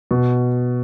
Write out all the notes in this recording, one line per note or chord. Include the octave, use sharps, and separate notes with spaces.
B2